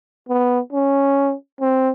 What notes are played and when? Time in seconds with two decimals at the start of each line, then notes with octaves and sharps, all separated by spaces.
0.29 B3
0.73 C#4
1.61 C4